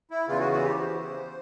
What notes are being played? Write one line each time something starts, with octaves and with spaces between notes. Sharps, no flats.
E4
E2 C#3 E3 F4
F#4
F#4
G4
E2 C#3 E3 C5